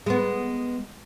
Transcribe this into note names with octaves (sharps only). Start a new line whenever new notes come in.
G#3 B3